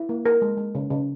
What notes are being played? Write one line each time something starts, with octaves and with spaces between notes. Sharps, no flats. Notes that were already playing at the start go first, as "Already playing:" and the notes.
Already playing: E4
A#3
A#4
G#3
G#3
C#3
C#3